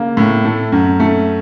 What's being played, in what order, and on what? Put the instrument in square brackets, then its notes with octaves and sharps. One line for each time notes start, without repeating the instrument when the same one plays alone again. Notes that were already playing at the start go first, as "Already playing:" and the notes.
Already playing: [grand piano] C#3 A#3
A2
A3
F#2
A3